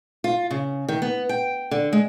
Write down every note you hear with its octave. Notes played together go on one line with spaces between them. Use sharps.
F4
C#3
D#3
B3
G5
D3
G#3